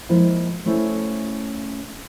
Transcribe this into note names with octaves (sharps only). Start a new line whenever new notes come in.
F3 G#3 A#3 E4 F4
A3 C#4 E4 C5 E5